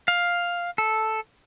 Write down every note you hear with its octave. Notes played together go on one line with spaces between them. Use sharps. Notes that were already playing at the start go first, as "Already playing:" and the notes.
F5
A4